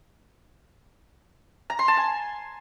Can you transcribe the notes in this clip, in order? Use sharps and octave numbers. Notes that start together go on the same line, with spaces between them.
A#5
C6
A5
G#5